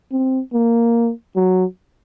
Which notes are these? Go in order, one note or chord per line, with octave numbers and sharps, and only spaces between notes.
C4
A#3
F#3